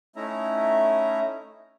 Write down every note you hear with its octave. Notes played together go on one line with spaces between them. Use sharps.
A3 C#4 D#4 E4 E5 A#5